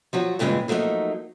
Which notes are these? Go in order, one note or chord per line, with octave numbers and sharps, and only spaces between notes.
F3 F#3 F#4
G2 A#2 C#3 E3 G#3
F3 F#3 A3 A#3 D#4